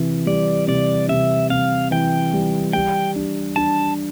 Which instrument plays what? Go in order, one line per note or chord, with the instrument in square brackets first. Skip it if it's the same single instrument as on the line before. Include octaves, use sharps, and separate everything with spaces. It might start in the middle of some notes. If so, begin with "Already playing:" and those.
Already playing: [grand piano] C3 E3
[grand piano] G3 [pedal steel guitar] D5
[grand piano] C3 [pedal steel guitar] D5
[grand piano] C3 [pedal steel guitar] E5
[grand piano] C3 [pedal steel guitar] F5
[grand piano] E3 [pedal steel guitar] G5
[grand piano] G3
[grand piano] G3 [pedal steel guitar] G5
[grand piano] D4
[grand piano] D4 [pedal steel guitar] A5